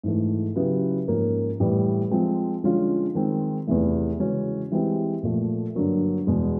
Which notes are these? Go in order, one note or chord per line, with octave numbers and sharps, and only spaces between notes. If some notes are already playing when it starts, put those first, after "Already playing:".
G#2 E3 A3
C#3 F#3 B3 E4 G4
G#2 F3 A#3 C#4
A2 E3 G3 B3
F3 G#3 C4
D3 F3 G#3 C#4 F4
D#3 G#3 C4
E2 C3 E3 A3
C#3 E3 G#3 C#4 F#4
E3 G#3 C4 E4 G4
A#2 F3 A3
G2 D3 F#3 A#3
E2 B2 G#3